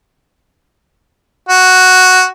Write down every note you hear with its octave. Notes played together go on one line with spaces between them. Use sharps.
F#4